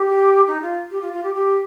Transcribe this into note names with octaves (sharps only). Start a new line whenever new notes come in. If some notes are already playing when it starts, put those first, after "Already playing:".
Already playing: G4
D#4
F4
G4
F4
F4
G4
G4